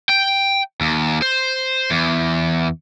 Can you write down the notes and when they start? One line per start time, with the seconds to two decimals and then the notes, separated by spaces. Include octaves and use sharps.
0.09 G5
0.81 D#2
1.22 C5
1.91 E2